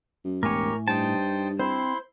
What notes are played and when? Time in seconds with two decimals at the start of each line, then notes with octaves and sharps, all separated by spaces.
0.24 F#2
0.43 E1 A2 G4 A#4 C#5 G#5
0.88 G2 D#4 C5 G5 A5
1.59 C4 E4 C5 C6